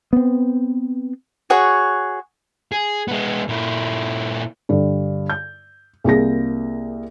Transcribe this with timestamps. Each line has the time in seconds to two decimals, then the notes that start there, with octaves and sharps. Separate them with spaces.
0.13 B3 C4
1.50 F#4 G#4 C#5 F#5
2.72 G#4
3.08 G#3 B3
3.49 A#2 E4
4.69 G2 D3
5.29 G6
6.04 C2 A#3 G#4 A#6